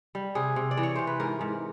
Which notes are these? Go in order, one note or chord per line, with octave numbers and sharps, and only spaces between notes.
G3
C3 G#4
C3
D5
E3
C#5
C3 C5
B4
G#2 A#4
G#2